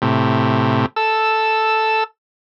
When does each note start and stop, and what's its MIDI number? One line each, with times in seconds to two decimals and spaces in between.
0.02 0.86 45
0.02 0.86 48
0.96 2.04 69
0.96 2.04 88